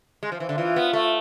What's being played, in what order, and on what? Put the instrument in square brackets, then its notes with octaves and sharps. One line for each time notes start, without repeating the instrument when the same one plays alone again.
[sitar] G#3
F3
E3
D3
[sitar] E3 [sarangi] F4
[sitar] B3
A3